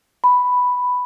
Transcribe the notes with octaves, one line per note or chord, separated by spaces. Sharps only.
B5